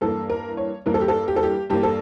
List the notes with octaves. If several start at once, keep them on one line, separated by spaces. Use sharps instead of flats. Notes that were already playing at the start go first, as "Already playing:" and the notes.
G2 E3 A#3 A4
A#4
C#5
G2 E3 A#3 A#4
A4
G4
A4
G4
A4
G4
G2 E3 A#3 G4
A4